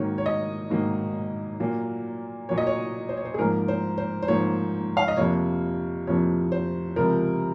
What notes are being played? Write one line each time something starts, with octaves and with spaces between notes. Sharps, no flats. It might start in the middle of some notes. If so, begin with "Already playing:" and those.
Already playing: G#2 D#3 F#3 A#3 C#5
C#5
D#5
G#2 D#3 F#3 A#3
A#2 F#3 A#3
A#2 F#3 A#3 C#5
D#5
C#5
C5
C#5
C5
G#4
G#2 F3 A#3 A#4
C5
C5
C5
G#2 F3 A#3 C#5
F5
D#5
F2 C3 F3 A#3 C#5
F2 C3 F3 A#3 C#5
C5
C#2 C3 F3 A#4